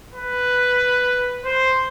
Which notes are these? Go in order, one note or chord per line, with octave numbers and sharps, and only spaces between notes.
B4
C5